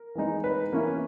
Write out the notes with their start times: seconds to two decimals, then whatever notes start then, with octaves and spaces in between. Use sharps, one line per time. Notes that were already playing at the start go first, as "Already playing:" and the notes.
Already playing: A#4
0.15 E3 G#3 D#4
0.44 B4
0.72 E3 A#3 C#4 E4